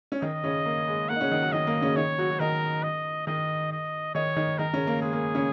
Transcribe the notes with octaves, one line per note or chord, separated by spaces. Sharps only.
C#4
D#3 D#4 D#5
C#3 C#4
A#3
G#3
A#3 F#5
D#4
C#3 C#4
D#3 D#4
F#3 F#4
D#3 D#4 D#5
A#3
C#3 C#4
D#3 D#4 C#5
F#3 F#4
F#4
D#3 D#4 A#4
D#5
D#3 D#4 D#5
D#5
D#3 D#4 C#5
D#3 D#4
D#3 D#4 A#4
C#3 C#4
A#3
G#3 G#4
A#3
C#3 C#4